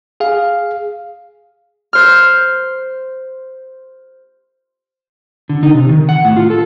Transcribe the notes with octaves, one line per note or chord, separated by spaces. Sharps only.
G#4 F5
C5 F6
D3
D#4
C3
D#3
F#5
A2
F4
A4